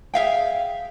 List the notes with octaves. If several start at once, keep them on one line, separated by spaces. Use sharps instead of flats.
G#4 E5 F5 G5